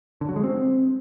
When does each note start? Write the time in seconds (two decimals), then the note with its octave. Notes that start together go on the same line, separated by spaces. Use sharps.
0.21 D3
0.29 F#3
0.36 G#3
0.44 C4